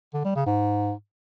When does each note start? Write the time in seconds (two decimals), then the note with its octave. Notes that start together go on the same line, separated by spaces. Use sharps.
0.14 D3
0.25 G3
0.35 C#3
0.46 G#2